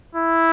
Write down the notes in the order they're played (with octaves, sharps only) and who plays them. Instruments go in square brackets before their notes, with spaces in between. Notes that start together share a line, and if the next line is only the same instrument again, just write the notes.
[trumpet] E4